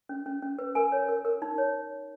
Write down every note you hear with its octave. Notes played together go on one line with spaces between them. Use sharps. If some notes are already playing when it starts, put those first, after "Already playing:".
C#4
C#4
C#4
B4
A#4 G#5
C#5
A#4
A#4
D#4
C#5